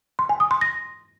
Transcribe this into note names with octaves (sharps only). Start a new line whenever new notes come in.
C6
G#5
D#6
C6
A#6